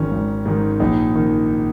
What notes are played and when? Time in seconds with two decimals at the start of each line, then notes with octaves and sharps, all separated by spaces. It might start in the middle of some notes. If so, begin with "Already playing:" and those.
Already playing: G#1 G#2 D#3 C#4
0.11 G#1
0.46 G#2 D#3
0.80 A#1 D#4
1.15 D#3